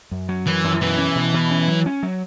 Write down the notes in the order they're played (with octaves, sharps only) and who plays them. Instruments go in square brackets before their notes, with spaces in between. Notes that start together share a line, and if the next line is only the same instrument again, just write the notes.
[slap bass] F#2
F#3
[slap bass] F#2 [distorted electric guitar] E3
[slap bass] F#2
[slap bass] B2 [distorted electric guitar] E3
[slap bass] C#4
B2
B2
C#4
F#3
C#4
F#3